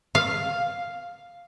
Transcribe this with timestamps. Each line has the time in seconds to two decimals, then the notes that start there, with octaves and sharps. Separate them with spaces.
0.15 F5